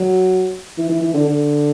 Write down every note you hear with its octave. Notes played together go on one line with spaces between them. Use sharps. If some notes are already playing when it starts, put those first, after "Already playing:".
Already playing: F#3
E3
E3
E3
D3
D3